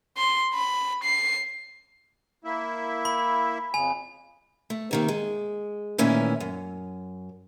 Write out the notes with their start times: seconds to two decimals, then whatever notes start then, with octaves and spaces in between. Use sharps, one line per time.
0.18 C6
0.54 B5
1.04 C7
2.44 A#3 E4 E5
3.05 B5
3.74 F2 C#3 G#5
4.70 A3
4.91 C3 D#3 A#3
5.08 G#3
5.98 A#2 D#3 E3 A3 C#4 E4
6.40 F#2